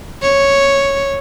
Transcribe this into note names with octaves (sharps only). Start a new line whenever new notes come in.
C#5